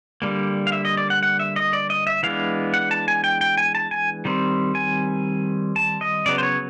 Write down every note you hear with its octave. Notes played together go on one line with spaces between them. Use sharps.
D3 G3 A#3
F5
E5
D#5
D5
F#5
F#5
E5
D#5
D5
D#5
E5
E3 G#3 B3 D4 F5
F#5
A5
G#5
G5
G5
G#5
A5
G#5
D#3 G3 C4
G#5
A5
D#5
C#3 F#3 B3 D5
C5
C#5